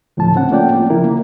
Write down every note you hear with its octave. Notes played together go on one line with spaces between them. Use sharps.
D2 A2 C#3 F3 A5
C4 C#4 F#5
A3 A#3 C#4 F4 D5 G5
F4
C#3 F3 E4 A#4
A#3